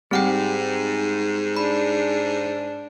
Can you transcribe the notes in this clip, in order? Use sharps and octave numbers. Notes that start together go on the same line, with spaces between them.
G#2 G3 C4 G#4 F#5 G5
D4 B5